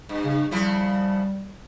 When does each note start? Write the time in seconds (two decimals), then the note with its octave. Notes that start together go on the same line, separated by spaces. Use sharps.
0.09 G2
0.25 C#3
0.51 C#3 F3 G3 E4